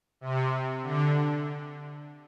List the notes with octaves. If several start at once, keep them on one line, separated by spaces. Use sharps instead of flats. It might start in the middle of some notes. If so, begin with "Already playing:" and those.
C3
D3